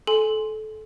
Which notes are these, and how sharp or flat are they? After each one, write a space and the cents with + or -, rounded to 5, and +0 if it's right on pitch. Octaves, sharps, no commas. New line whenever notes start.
A4 -25 G#5 +0 C6 +0